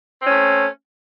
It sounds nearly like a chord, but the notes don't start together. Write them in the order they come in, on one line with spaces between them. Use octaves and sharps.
C4 C#4 A3